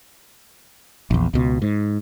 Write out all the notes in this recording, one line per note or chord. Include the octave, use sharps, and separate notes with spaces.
A#1 E2
C#2 B2
G#2